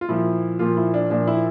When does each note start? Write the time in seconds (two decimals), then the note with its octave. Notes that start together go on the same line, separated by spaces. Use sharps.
0.01 F4
0.08 A#2 F3 E4
0.59 A#2 F3 F4
0.77 E4
0.94 D4
1.10 A#2 F3 D4
1.27 E4